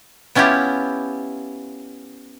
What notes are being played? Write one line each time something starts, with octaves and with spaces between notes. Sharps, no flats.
B3 C#4 E4 F4 G4